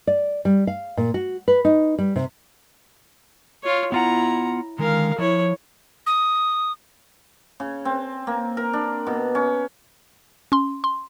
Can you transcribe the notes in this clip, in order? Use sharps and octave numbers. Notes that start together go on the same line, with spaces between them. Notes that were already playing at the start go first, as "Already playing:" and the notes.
D5
G3
F5
A#2
F#4
B4
D#4
G3
C3
F4 C#5
B3 E4 F4 F#5 A#5
D3 D#3 G#3 A#4 F5
F3 E4 C#5
D#6
C#3
C4
A#3
A#4
D4
B2
C#4
C#4 C6
C6